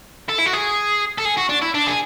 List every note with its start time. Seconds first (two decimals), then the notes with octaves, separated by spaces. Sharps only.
0.29 A4
0.39 E4
0.46 F#4
0.53 G#4
1.18 A4
1.25 G#4
1.38 F#4
1.49 D4
1.62 E4
1.74 D4
1.87 G#4